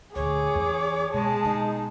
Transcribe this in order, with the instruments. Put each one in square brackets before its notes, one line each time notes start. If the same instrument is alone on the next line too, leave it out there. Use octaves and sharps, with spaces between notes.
[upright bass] D2 A#2 [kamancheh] G#4 D6 [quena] C#5
[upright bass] E2 C#4
[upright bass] B2 [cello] G#3 [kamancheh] G#4 A5
[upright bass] B2 [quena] D#4